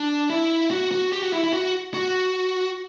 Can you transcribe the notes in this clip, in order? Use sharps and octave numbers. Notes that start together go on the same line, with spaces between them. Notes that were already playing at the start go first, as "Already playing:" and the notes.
Already playing: D4
E4
F#4
F#4
G4
F#4
E4
E4
F#4
F#4